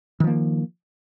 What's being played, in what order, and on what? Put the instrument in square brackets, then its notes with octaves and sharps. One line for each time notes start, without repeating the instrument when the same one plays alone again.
[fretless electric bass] D#3
F3
A#3